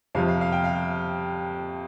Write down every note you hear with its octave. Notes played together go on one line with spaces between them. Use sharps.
F2 C3 F3 F5
F5
F5
G5
F5